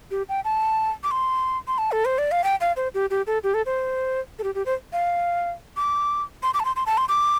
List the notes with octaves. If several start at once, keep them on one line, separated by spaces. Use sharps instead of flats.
G4
G5
A5
D6
C6
C6
A5
A4
C5
D5
F5
G5
F5
C5
G4
G4
A4
G4
A4
C5
A4
G4
G4
C5
F5
D6
C6
D6
A5
C6
C6
A5
C6
D6